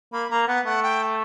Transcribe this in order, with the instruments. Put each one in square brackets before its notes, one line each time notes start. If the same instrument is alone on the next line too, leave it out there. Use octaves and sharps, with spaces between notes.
[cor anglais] A#3 [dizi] B5
[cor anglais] A#3 [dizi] A#5
[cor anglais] B3 [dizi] F#5
[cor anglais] A3 [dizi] F#5
[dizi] G5